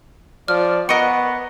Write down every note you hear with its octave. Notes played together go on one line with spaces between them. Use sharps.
F3 D5 F6
B3 A#4 D#5 F#5 C#6 C#7